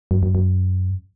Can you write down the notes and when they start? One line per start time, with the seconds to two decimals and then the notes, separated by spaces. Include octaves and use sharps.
0.11 F#2
0.23 F#2
0.35 F#2